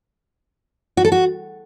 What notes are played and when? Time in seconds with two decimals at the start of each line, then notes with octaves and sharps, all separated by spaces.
0.97 F#4
1.05 A4
1.12 F#4